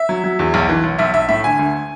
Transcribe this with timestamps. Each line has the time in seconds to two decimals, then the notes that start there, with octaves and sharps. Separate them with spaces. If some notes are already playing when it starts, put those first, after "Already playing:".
Already playing: E5
0.09 F#3
0.24 F#3
0.39 E2
0.54 B1
0.69 E3
0.84 B1
0.99 B1 E5
1.14 B1 E5
1.29 A2 E5
1.44 D3 G#5
1.59 D2